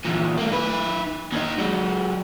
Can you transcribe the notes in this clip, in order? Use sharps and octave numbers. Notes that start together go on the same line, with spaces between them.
E2 A#2
A3 A#3
D#3 B4
D#2 D#4
F#3 G#3